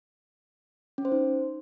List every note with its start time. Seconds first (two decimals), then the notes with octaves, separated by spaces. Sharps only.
0.98 C#4
1.05 C5
1.12 D#4